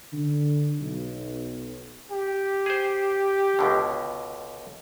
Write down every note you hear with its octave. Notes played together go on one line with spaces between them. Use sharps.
D3
B1
G4
G#4 C5
C#2 B2 D3